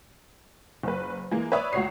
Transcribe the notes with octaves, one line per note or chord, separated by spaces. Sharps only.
F#1 B4
E3 G#3 A#3
B4 C#5 D5 E5 D#6
C#2 F#4 C#5 C7